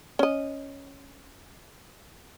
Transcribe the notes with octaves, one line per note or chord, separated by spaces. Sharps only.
C#4 D#5